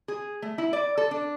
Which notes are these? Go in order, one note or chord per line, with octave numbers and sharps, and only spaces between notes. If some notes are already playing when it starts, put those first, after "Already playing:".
G#4
A3
E4
D5
A4
D4